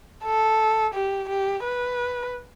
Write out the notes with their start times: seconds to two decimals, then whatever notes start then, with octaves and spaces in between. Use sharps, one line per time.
0.24 A4
0.94 G4
1.29 G4
1.64 B4